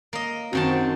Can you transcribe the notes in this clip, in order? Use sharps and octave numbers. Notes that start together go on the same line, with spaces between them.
A#3 D#5
F#2 D#3 C4 F#4 A5